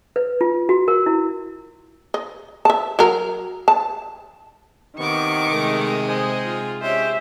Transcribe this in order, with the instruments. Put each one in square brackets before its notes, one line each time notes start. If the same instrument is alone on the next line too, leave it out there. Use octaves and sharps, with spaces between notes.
[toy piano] B4
F4
F#4
A#4
E4
[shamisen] D#5
E5 A5
F#3 A#4
A5
[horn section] C3 B3 [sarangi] D#3 [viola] C#6 D6
[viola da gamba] C3 G#3 G#4 [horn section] A3 A#4
[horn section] C5 D#5 G#5
[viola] F4
[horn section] G#3 C#4 [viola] G4 C5 [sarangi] E5